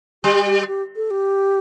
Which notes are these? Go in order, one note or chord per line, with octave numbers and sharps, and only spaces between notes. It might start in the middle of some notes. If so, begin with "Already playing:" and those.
G3 G4
G4
G4
A4
G4